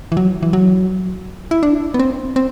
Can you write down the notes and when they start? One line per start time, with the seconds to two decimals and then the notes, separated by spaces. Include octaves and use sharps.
0.12 E3
0.17 F#3
0.43 E3
0.53 F#3
1.51 E4
1.63 D4
1.94 B3
1.99 C4
2.36 C4